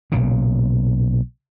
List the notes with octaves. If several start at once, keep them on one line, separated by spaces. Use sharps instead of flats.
B1 A#2 C#3